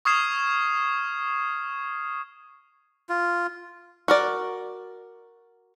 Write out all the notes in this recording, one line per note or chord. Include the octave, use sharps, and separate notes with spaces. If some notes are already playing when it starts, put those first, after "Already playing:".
C#6 D#6 F6 G#6 C7 E7
F4
F#4 A#4 D5